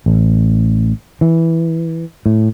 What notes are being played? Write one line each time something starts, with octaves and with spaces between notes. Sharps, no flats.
A1
E3
A2